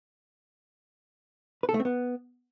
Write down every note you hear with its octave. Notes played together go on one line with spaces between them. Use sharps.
B4
A4
A3
C4
B3